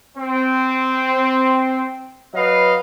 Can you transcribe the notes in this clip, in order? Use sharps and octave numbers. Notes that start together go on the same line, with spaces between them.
C4
F#3 B4 D#5 F5